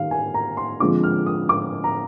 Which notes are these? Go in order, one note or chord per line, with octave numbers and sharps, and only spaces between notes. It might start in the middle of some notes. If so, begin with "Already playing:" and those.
Already playing: D#3 G3 F5
G#5
A#5
C6
D3 F3 G#3 C4 D6
F6
D#6
D6
A#5